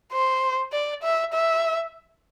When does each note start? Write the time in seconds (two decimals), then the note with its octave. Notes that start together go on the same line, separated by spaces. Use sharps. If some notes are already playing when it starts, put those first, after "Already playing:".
0.12 C5
0.72 D5
1.03 E5
1.33 E5